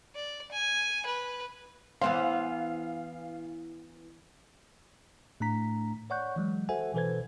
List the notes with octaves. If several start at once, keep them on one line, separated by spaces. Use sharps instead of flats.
D5
G#5
B4
E3 B3 C5 F5
A2 A3 D4 A#5 B6
C#5 D5 F#5 C#6 F#6 G6
E3 F#3 G#3
F#4 A4 C5 E5 F#5 G#5
B2 E3 A4 B4 C5 G#6